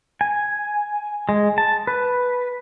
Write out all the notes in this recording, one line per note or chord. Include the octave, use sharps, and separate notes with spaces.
G#5
G#3
A5
B4